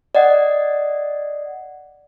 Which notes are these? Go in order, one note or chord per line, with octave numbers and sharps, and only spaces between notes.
D5 D#5 F#5